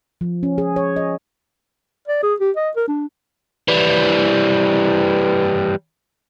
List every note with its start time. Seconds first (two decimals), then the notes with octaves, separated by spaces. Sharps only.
0.21 F3
0.43 C#4
0.58 G#4
0.76 C#5
0.96 D#5
2.08 D5
2.23 G#4
2.40 G4
2.56 D#5
2.76 A#4
2.88 D4
3.68 E3 G3